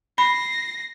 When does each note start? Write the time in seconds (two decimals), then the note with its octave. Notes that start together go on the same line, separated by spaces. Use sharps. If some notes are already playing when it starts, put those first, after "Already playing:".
0.18 B5 A#6 C7